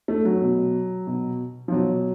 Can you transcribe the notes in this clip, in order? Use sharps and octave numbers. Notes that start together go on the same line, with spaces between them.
A3
F#3
B2
B2
F3
B2 F#3